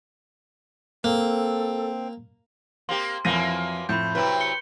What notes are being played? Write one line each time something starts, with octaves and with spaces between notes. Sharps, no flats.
A#3 C4 A4
A#3 C4 G4 C6
F2 E3 F#3 A#3 A#6 D#7
F2 A2 B5 G6
C3 F#3 E4 B4
C#7 G7